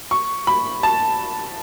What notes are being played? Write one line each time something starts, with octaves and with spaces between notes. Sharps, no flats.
C#6
B5
A5